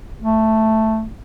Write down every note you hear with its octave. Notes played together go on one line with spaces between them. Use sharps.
A3